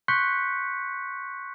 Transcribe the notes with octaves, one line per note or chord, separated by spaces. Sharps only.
C6 C#6 F#6 G6 B6 C#7